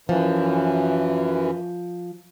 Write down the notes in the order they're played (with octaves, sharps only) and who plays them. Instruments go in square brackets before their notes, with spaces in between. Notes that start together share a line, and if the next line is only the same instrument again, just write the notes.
[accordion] F#2 E3 [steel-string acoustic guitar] F3